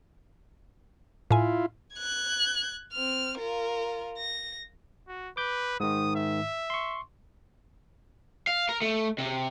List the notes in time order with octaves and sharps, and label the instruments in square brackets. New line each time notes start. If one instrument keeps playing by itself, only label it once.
[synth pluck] A2 G#5 [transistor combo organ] E4 F4
[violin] F#6 G#6
C4 F6
F4 A#4
A#6
[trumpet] F#4
[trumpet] B4 [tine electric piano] D6 G6
[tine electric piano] G#2 D#3 [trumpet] D#6
[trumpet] E5
[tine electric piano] C6 C#6
[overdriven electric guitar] F5
A#4
A3
C3